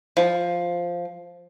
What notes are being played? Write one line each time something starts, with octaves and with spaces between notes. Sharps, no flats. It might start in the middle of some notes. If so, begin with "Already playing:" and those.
F3